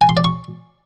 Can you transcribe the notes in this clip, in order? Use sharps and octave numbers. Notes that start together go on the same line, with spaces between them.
G#5
C6
D5
C#6